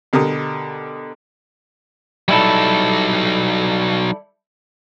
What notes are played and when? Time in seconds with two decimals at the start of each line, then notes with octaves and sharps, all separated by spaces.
0.13 B2 D3 G4 A#4 D#6
2.28 F#3 G3 D#4 E4 A4